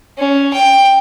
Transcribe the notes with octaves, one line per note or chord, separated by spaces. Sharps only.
C#4
G5